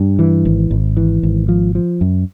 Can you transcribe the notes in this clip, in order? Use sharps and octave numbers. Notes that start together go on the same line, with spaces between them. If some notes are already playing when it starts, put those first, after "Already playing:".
Already playing: G2
E3
G#1
G#1
E3
G#1
F3
F3
F#2